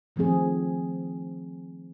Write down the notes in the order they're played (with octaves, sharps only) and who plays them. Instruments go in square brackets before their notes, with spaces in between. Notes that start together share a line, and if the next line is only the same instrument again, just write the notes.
[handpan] D#3 F3 A3 C4 G#4